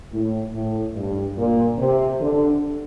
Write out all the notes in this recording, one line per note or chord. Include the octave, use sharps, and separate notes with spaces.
A2
A2
G2
A#2
C3
D3